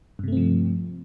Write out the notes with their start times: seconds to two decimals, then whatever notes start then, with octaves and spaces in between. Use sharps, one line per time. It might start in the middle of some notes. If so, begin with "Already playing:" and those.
0.19 G2
0.24 C3
0.28 A3
0.32 C4
0.37 F3